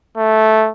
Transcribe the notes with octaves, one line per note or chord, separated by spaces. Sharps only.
A3